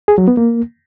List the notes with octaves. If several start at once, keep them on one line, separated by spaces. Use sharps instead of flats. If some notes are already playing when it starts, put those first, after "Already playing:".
G#4
F#3
B3
A#3